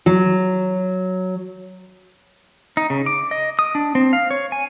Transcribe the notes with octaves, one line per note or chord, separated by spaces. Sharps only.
F#3
D#4
C#3
D6
D#5
D#6
D4
C4
F5
C#5
G#5